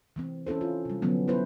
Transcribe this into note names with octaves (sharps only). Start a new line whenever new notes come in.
E3 A3 C4
C#4 E4 A4 C5
F4
C3 G3
D3 F3 F#3 A3 B3 C#4
B3 E4 B4 C5